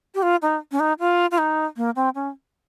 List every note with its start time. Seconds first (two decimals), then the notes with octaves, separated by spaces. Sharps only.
0.15 G4
0.23 F4
0.42 D#4
0.72 C#4
0.80 D#4
0.99 F4
1.31 F4
1.38 D#4
1.77 A#3
1.96 C4
2.15 C#4